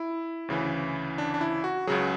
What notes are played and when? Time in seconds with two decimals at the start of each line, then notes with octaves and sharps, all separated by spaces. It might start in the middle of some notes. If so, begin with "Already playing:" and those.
Already playing: E4
0.48 D2 C#3 E3
1.18 D4
1.34 D4
1.41 E4
1.64 F#4
1.87 C#2 C#3 F#3 G#4